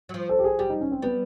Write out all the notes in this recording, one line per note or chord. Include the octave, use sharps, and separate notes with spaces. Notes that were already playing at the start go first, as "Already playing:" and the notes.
F#3
F3
A4
G4
G#4
G3 G4
D#4
C#4
C4
G3 B3